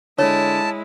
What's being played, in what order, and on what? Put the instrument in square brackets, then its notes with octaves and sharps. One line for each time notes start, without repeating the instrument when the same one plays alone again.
[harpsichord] D3 [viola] G#3 E4 [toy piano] C#5 [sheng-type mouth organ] A5